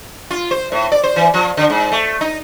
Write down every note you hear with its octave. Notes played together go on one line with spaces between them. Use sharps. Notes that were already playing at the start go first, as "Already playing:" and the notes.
F4
C5
A2
D5
C5
E3
F3
D3
G#2
A3
D#4